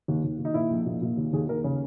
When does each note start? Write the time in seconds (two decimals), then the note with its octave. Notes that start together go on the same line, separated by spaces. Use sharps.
0.08 D#2
0.24 D#2
0.39 D#2
0.45 D#4
0.54 A#2 E4
0.70 A#1
0.86 A#2
1.02 A#2
1.17 D#2
1.33 D#2 G#4
1.48 D#2 A#4
1.64 C#3